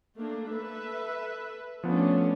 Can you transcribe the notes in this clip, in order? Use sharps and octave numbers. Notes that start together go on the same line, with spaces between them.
A3 A#3 D4
A4 B4 E5
F3 A3 B3 C#4 D4